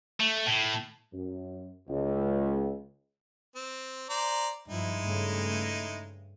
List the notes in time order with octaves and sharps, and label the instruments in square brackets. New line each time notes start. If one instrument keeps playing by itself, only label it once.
[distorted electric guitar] A3
A2
[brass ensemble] F#2
C#2
[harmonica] C4
C5 D5 A#5
[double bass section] G2 F3 [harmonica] G#3 D#4 E4
[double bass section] G2 C#3 A3